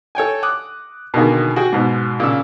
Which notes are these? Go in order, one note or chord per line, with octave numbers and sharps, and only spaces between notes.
A4 C#5 G5 G#5
D6 D#6 F#6
B2 D3 D#3 A#3 G#4
F#4 G#4 G5
G#2 B2
A#2 C#3 E6